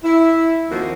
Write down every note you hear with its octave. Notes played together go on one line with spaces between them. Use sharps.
E4
D#2 F3 A#3 C4 D#4 F#4